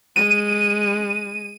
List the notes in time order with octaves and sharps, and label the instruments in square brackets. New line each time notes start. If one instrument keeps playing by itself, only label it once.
[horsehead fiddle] G#3 [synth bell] D#7